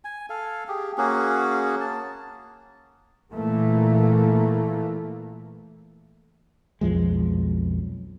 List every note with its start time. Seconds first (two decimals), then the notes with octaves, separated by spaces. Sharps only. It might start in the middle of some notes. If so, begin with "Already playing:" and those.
0.05 G#5
0.30 A4 F5
0.68 G4 G#4
0.98 A#3 C#4 F#4 G#4
1.81 A5
3.33 A#2 E3 A3 A#3
6.81 B1 F2 F3 G#3